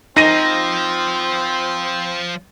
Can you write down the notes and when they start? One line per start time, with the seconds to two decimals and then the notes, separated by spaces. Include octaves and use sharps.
0.17 F3 C4 D#4 A#6 D#7